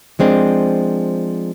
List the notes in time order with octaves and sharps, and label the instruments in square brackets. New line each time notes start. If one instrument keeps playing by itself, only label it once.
[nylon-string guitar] F3 G#3 C4 D4